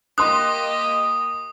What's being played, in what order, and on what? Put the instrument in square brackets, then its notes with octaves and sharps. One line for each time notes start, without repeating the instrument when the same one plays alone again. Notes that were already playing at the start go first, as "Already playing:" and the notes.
[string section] A#3 G4 D#5 [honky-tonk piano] C6 F#6 [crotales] D#6